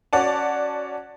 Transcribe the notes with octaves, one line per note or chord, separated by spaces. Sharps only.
C#4 F#4 D5 F#5 A5